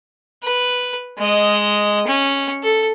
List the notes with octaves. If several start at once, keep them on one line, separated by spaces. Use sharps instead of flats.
B4
G#3 D#5
C#4
A4